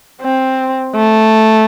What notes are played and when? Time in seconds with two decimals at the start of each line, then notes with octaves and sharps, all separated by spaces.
0.21 C4
0.95 A3